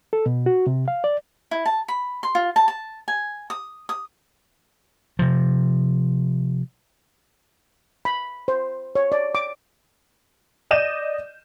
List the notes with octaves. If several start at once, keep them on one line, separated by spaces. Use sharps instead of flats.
A4
B2
F#4
C3
F5
D5
E4
A5
B5
C6
F4
A5
A5
G#5
D#6
D#6
C3 F3
B5
C5
C#5
D5
D6
D5 D#5 G6 D#7 E7